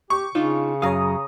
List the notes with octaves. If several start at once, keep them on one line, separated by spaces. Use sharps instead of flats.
G4 C#6
C#3 D4 D#4 F4
F#2 C#5 F5 A#5 D#6